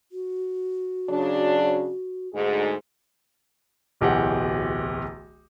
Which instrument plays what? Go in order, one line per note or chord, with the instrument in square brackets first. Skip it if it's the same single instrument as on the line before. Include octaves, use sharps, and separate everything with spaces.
[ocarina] F#4
[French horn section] C#3 F#3 D4
D2 G#2 G#4
[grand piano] D1 B1 E3 G4 G#4 F#5